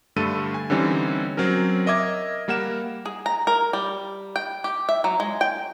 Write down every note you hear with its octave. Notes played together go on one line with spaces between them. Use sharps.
G2 D3 G3 A3 A4 D#7
G#5
D3 E3 G3 C4 C#4 D#4
F#3 C4 C#4 A#4
A#4 D#5 E5 D6 G#6
G3 A#3 A#4 F#5 E7
G#4
A#5
A#4
G3
G5
G4
E5
F#3
G#3
G5